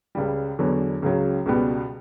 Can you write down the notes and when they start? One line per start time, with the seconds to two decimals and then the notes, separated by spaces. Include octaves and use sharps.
0.15 C#2 C#3 G3
0.59 E2 D3 F#3 B3
1.02 C#2 C#3 F#3
1.46 C#2 B2 G3 B3